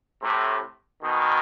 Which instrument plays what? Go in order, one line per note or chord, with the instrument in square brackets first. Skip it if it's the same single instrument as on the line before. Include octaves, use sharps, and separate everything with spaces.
[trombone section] A2 C3
B2 D#3